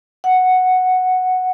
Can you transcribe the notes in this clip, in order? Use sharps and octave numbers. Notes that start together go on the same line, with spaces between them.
F#5